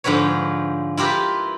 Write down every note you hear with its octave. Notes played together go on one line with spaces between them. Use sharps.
G#2 D3 F3 B4 C#5
E4 F4 G4 A#4 B4